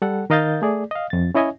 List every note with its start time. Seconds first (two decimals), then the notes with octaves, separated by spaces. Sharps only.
0.02 G3 A4 F#5
0.30 D#3 A#4 D#5 F5 G6 A6
0.62 A3 G#4 D5
0.91 D#5 F5
1.10 F2 A6
1.35 C#4 E4 C#5 D#5 E5 G#5